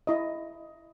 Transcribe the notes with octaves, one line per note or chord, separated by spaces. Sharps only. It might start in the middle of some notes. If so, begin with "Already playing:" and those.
E4 D#5